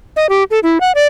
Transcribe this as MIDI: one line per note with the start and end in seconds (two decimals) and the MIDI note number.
0.16 0.29 75
0.29 0.43 67
0.51 0.59 69
0.63 0.78 64
0.81 0.92 78
0.95 1.07 74